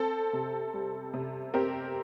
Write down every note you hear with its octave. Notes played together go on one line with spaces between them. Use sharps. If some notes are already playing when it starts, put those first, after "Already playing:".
Already playing: C4 A4
C3
G3
C3
C4 G4 A#4